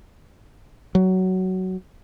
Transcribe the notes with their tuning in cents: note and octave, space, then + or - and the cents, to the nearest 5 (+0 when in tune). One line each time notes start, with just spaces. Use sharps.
F#3 +15